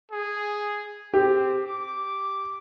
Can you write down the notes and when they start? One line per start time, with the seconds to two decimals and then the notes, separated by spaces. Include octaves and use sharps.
0.11 G#4
1.14 C4 G4
1.65 D6